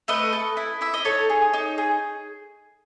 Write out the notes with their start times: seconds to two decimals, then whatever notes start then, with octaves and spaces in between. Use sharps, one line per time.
0.08 A3 B4 D#5
0.32 A4
0.57 E4
0.81 E4 E5
0.94 D#5
1.05 D#4 A4 C#5
1.30 G#4
1.53 D#4
1.78 G#4